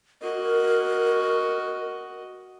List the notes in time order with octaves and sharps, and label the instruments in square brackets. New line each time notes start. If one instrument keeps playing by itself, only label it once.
[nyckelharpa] F#4 D#5 [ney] A#4